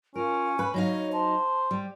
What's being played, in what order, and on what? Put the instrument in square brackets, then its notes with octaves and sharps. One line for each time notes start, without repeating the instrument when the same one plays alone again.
[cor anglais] C#4 [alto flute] F4 [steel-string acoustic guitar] A#4
[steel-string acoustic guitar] B4 [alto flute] B5
[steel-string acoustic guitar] F#3 D#4 F5 [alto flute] C#5
[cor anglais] C5 [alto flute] A5
[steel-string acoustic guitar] G3